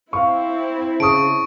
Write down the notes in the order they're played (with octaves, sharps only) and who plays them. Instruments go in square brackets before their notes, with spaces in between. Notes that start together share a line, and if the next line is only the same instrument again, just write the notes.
[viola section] C4 E4 [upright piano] F5 C#6
[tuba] C#3 [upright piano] A5 D#6 [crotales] C#6 D7